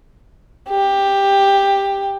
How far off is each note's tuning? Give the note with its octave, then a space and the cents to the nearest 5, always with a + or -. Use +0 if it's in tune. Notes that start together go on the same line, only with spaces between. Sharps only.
G4 +10